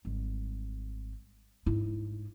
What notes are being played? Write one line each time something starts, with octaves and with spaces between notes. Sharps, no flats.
G#1 G3
G#2 E4